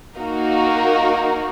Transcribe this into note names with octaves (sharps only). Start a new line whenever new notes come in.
A#3 D#4 F#4 A#4